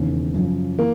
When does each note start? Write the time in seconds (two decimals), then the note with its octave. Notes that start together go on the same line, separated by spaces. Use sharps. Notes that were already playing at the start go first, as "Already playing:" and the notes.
Already playing: E1 D#2 C#3
0.34 F#2 C#3 F3
0.78 E3 A#3